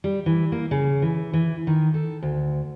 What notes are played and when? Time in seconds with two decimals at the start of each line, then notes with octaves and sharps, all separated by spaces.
0.04 G3
0.26 E3
0.52 A#3
0.71 C#3
1.02 E3
1.33 E3
1.67 D#3
1.94 A4
2.22 D2